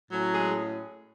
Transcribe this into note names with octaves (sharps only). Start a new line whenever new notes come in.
A2 F#3 C#4
G#3 G#4